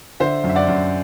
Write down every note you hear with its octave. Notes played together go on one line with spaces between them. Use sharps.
D3 C5 E5
F#2
E5
D5 F#5
F#2